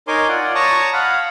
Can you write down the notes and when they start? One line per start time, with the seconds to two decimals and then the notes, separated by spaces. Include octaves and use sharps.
0.08 D#4 A#4 C#5 G#5 C6 D6
0.29 F4 D5 F#5
0.55 C#5 A5 A#5 C#6 D#6
0.93 F5 F#5 B5